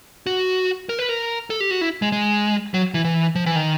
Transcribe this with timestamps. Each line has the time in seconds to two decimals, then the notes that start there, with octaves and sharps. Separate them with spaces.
0.27 F#4
0.89 A#4
0.99 B4
1.09 A#4
1.50 A4
1.60 G4
1.71 F#4
1.81 E4
2.02 G#3
2.12 G#3
2.74 F#3
2.94 E3
3.04 E3
3.35 F3
3.46 E3
3.56 D#3